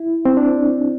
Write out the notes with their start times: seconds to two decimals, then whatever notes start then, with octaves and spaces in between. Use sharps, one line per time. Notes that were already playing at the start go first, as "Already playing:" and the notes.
Already playing: E4
0.25 C4
0.37 D4